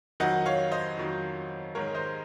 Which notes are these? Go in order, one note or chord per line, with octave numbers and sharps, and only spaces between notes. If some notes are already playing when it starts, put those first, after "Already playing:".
F2 D#3 F#3 D#5 F#5
C#5 F5
C5 D#5
F2 D#3 F#3
G#2 D#3 G#3 A#4 C#5
C5 D#5